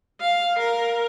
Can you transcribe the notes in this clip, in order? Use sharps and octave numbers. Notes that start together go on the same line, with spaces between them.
F5
A#4